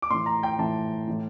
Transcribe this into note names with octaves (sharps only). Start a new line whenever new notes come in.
D6
A2 E3 C6
A#5
G5
A2 E3 A5
A2 E3